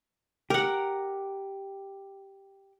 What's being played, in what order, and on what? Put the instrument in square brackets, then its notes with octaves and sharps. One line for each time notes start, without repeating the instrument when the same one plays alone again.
[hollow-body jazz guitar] G4 [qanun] A#4 F#5